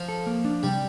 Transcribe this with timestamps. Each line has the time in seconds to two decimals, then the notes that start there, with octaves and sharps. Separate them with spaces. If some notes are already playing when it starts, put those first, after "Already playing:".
Already playing: F3
0.09 A4
0.26 A#3
0.45 D4
0.63 C3 G3